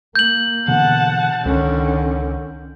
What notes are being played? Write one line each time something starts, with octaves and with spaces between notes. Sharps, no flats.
A#3 G6 F#7
B2 D3 E3 F#5 A5
C#2 D3 D#3 C#4